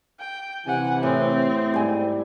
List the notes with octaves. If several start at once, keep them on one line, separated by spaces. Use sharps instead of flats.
G5
C3 E3 F#5 G#5
A2 C4
G#2 G3 G#5